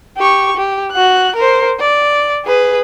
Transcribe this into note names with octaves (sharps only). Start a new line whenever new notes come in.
G4 C#6
G4
F#4 F#6
A#4 C5
D5
G#4 B4